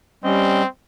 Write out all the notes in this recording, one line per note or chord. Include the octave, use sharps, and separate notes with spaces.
G3 C4 C#4 D#5